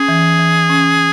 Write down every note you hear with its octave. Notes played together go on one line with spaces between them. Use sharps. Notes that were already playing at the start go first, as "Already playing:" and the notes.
Already playing: C#4 G#4
E3
E3
C#4